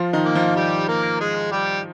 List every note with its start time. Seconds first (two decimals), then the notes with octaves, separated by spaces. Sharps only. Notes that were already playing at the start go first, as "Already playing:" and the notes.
Already playing: F3 F4
0.13 D#3 D#4
0.25 A#3
0.35 F3 F4
0.56 G3 G4
0.88 A#3 A#4
1.20 G#3 G#4
1.52 G3 G4